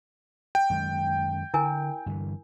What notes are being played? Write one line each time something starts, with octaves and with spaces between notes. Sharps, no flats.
G5
F#2 D#3 G#3
D3 E4 A#4 G#5
G2 D3 E3